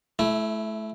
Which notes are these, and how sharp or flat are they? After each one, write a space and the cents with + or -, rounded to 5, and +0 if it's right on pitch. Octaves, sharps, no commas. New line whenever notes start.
A3 -30 E4 +5